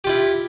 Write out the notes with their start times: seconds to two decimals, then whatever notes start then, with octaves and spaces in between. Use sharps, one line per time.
0.04 G4
0.07 F4
0.09 E4